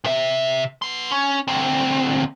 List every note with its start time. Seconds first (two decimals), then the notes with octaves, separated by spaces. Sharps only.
0.04 C3 E5
0.82 B3 C6
1.11 C#4
1.48 D2 C4